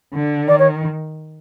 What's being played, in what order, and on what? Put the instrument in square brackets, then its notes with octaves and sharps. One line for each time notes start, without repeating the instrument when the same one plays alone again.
[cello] D3
[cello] D#3 [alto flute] D5
[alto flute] C#5